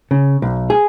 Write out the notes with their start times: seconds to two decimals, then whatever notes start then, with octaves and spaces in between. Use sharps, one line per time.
0.11 C#3
0.42 B1
0.70 G#4